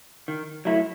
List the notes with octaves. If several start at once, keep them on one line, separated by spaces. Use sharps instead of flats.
D#3
F#3 A3 E4